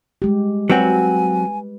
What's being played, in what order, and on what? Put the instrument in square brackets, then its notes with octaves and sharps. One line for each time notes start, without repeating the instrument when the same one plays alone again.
[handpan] G3 G#3 G4
[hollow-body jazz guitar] F#3 C4 F#4 [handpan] B4 [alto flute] G#5